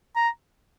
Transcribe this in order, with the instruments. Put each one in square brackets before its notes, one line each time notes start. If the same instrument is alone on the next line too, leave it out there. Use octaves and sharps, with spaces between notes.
[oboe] A#5